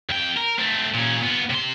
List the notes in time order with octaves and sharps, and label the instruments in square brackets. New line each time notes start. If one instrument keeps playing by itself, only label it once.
[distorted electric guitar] F2 G5
A#4
A3 C4
A#2 C#4
B3 F4
C3 C6